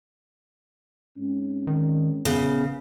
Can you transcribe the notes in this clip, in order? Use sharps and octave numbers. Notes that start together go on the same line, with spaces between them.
G#2 C4 C#4
D#3
A#1 C#3 B3